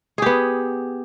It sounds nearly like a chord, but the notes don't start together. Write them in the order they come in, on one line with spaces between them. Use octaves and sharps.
G#4 G4 B3